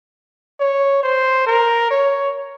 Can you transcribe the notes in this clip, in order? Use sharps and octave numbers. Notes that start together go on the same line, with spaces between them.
C#5
C5
A#4
C#5